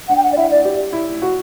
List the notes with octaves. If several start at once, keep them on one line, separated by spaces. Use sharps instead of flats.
D4 F#5
G5
F#5
D5
E4 E5
D5
G4
E4
F#4